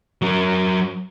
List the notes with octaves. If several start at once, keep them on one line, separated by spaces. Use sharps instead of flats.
F#3 A#4